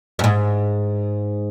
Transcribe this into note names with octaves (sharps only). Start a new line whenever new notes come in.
F#2
G#2